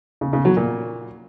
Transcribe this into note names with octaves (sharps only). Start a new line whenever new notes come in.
C#3
C#3
F#3
A#2